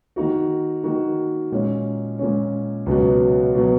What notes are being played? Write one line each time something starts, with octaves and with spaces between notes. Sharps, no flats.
D#3 A#3 D#4 F#4
D#3 A#3 D#4 F#4
A#2 G#3 C#4
A#2 G#3 C#4
C#2 B2 F#3 B3
B2 F#3 B3